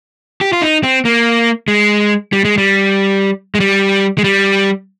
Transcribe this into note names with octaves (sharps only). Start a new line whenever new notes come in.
G4
F4
D#4
C4
A#3
G#3
G3
G#3
G3
G#3
G3
G#3
G3